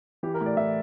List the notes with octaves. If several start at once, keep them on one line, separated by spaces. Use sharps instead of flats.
E3 G4
A#4
A2
D5
E3 E5